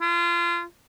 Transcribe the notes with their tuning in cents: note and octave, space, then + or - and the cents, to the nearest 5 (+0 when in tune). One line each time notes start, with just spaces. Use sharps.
F4 -30